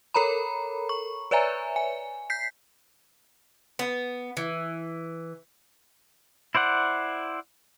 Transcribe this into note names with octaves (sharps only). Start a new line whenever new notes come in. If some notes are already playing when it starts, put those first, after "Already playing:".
A4 A#4 C#5 A#5 B5
C#6
B4 C#5 D5 E5 G#5 A#5
G#5
G6 B6 C7
B3
E3
E4 C5 D5 F#5